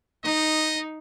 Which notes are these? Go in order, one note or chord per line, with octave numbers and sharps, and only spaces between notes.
D#4 D#5